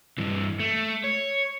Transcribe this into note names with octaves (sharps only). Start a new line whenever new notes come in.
G2 E3
A3
C#5